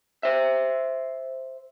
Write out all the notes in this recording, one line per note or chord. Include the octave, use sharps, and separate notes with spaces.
C5 E5